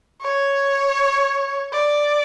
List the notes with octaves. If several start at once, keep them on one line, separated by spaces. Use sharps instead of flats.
C#5
D5